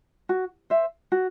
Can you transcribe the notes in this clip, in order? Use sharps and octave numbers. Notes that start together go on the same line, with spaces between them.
F#4
C5 E5
F#4